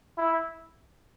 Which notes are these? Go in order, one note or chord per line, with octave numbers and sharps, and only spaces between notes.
E4